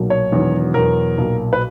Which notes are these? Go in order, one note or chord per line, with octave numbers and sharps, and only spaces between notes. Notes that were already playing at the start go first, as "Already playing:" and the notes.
Already playing: B1 A#2 F#3
C#5
E1 E2 D#3 F#3
E2 B2 F#3 A#4
B1 A#2 F#3
B4